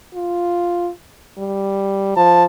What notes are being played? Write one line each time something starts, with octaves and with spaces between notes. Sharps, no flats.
F4
G3
F3 A5